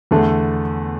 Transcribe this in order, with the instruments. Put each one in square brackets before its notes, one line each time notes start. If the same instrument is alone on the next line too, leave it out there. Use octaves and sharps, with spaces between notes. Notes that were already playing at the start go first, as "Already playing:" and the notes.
[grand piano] E2 D3 A3